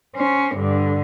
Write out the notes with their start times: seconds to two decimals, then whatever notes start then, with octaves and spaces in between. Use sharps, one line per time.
0.15 C#4 C5
0.56 G2 D3